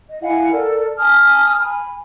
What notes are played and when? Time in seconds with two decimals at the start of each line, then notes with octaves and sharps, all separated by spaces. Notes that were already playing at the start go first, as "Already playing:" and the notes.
0.09 D#5
0.23 E4 F5 F#5 G#5
0.51 A4 A#4 D5
0.98 G#5 A5 D#6 F6
1.59 G#5 B5